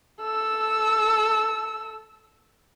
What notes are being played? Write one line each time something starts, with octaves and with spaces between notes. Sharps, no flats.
A4 E6